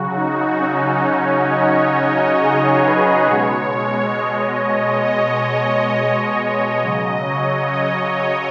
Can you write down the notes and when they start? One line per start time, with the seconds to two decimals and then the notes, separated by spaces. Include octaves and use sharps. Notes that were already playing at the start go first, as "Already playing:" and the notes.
Already playing: C#3 F#3 F#4
0.14 D#4
0.59 C#4
1.03 C#5
1.48 D#5
1.93 C#5
2.37 G#4
2.82 B4
3.26 B2 G#3 C#5
4.16 D#5
4.60 C#5
5.05 D#5
5.49 C#5
5.94 C#5
6.39 D#5
6.83 C#3 F#3 D#5
7.27 C#5
7.72 D#5
8.16 C#5